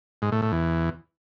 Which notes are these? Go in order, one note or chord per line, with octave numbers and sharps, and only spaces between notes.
G#2
A2
A2
E2